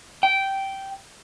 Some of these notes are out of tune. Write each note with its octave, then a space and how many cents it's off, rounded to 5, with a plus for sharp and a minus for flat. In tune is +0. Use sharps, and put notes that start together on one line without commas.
G5 -10